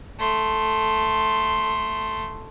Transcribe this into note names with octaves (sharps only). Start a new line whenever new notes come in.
A3 C6